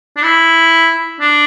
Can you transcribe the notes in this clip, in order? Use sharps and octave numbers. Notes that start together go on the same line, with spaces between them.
D4
E4
D4